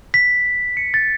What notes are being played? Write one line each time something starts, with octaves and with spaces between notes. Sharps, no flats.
B6
C#7
A6